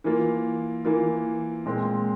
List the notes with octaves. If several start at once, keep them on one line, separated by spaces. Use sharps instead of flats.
E3 A#3 F4
E3 A#3 F4
A#2 G#3 C4